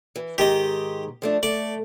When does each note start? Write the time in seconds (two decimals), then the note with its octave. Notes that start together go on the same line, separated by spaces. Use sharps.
0.16 E3
0.38 G#2 D#3 G#3 G4 D#5
1.22 F3 A3 D4
1.43 A3 D5